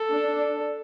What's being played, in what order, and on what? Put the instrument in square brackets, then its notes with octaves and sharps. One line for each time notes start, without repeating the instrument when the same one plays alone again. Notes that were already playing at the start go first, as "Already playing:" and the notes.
Already playing: [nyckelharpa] A4
[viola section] D4